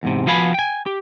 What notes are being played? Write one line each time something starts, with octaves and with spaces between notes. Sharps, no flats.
E2 G#2 C3
F3 B3 F#4 F5 G#5 B5
G5 G#5
G4